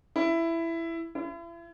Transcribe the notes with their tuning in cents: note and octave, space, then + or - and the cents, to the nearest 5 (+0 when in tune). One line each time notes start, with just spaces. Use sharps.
E4 +10
E4 +40